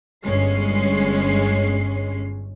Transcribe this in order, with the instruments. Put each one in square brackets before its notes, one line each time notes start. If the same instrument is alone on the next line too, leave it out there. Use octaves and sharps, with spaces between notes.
[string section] G1 G2 G#3 C#4 C7